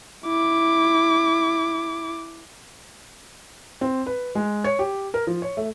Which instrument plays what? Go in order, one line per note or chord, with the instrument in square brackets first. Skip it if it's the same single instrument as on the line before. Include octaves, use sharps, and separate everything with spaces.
[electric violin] E4 D6
[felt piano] C4
B4
G#3
C#5
G4
A#4
F3
C#5
A3